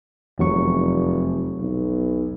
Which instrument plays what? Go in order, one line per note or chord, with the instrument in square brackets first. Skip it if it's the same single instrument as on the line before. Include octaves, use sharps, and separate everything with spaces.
[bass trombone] F1 [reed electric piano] E2 F#3 C#6
[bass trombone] B1